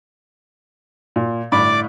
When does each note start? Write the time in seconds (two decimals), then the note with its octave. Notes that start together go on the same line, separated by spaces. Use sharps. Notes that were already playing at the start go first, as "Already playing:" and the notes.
1.16 A#2
1.52 G1 A2 D5 B5 D6